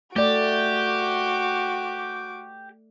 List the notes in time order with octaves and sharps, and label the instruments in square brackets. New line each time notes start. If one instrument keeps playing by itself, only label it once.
[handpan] A3 D5 [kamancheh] F#4 D6 [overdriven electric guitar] G4